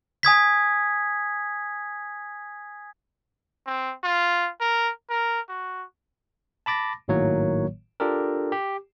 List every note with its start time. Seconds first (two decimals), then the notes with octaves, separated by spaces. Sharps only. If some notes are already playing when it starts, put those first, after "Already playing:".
0.23 G#5 D#6 G#6 B6
3.67 C4
4.04 F4
4.61 A#4
5.10 A#4
5.49 F#4
6.66 A5 B5 D6 A6 A#6
7.08 G#1 A2 D#3 F#3 A#3 C#5
8.00 D4 F4 G4 A4 A#4
8.52 G4